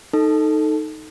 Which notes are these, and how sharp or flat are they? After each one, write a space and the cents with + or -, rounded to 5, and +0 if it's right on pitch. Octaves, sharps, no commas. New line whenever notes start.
D#4 +0 A4 +0